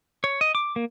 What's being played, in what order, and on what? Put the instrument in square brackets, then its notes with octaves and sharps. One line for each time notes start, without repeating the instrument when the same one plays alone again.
[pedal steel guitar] C#5
D#5
D6
A#3